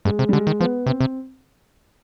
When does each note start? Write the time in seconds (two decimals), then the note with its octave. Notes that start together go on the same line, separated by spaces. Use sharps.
0.05 G2 G#3
0.19 C3
0.29 G3
0.33 D3 G#3
0.47 D#3
0.60 F3 B3
0.86 C3 C4
1.00 C3